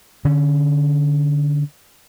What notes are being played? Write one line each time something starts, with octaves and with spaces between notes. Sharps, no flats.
D3 C#4